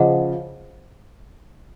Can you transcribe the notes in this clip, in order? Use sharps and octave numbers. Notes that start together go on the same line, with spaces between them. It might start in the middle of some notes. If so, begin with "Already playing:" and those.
Already playing: C#3 F3 G#4 C5 D#5 F#5